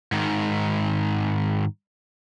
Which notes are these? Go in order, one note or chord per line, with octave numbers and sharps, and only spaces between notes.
G#2 D#3